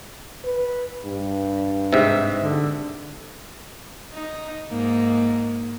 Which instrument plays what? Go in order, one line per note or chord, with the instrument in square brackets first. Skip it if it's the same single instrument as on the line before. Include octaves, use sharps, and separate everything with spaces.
[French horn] B4
G2
[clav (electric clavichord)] G#2 C3 [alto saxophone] E5
[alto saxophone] D3
[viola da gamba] D#4
G#2 A#3